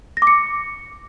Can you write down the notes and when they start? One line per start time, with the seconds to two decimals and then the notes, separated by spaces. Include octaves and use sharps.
0.17 A#6
0.22 D6
0.27 C#7